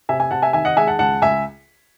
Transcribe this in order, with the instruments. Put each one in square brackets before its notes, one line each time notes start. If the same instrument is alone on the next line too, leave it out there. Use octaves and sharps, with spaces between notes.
[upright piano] C3 E5 G#5
E5 G#5
C3 F#5 A5
E5 G#5
D#3 E5 G#5
D#5 F#5
G#3 E5 G#5
F#5 A5
C#2 F#5 A5
C#2 E5 G#5